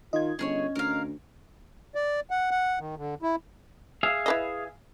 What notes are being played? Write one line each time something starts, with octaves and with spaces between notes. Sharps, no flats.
D#3 F4 D#5 G#6
G1 C#4 G#4 A#4 C#5
D2 A#4 F5
D5
F#5
F#5
D#3
D3
E4
G#4 E5 F5
E4 B4 D#5